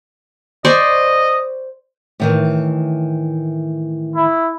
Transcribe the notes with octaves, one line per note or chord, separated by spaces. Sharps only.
C5 D5 D#5 C#6
A2 D#3 E3
E4